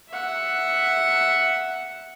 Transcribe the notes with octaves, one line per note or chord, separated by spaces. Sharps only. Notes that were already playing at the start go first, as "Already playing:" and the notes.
E5 F#5